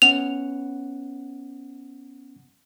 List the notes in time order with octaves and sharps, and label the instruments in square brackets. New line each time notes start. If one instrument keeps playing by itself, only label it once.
[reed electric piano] B3 C#4 F#5 [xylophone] F7